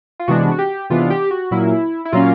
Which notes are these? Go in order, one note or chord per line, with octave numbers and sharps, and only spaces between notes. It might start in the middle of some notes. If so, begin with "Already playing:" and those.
F4
C3 E3 G#3 B3 D4 F#4
F#4
G4
C3 E3 G#3 B3 D4 F4
G4
F#4
A#2 F#3 A#3 C#4 E4
E4
A#2 F#3 A#3 C#4 F4